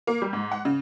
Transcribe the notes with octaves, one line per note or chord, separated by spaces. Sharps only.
A#3
G3
G#2
F#5
C#3